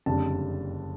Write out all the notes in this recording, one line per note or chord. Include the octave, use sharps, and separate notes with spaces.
F#1 F2 D3 G3 A5